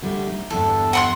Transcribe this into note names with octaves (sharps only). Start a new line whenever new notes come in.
D3 G3 A3
D#4
E2 G2 D3 A4
F#5 C6 F#6